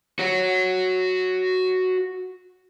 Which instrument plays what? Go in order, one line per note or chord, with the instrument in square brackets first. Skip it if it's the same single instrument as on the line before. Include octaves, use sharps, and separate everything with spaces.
[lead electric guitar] F#4 C#5